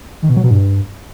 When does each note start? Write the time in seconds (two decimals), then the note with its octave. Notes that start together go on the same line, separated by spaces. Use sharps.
0.22 D#3
0.30 B2
0.37 F#3
0.44 B2
0.51 G2